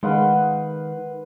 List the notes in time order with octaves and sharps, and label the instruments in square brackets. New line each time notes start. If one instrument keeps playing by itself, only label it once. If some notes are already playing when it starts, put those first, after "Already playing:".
[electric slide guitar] D#3 [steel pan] G#3 F5 [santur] B4 F#5 C6